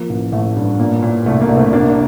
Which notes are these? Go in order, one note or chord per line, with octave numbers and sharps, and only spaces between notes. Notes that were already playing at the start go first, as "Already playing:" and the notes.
Already playing: F3 A#3
A1
A1 A3
G2
A#2 A#3
A#2
C2 A3
A#3
C2
A3 C4
F1 A#3 D4